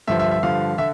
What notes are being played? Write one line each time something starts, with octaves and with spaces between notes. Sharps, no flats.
G2 D3 F3 E5
E5
E5
G2 D3 F3 F5
D3 E5